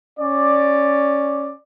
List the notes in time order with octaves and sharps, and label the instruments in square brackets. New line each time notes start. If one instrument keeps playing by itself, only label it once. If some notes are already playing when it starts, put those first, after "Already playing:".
[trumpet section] C#4 D5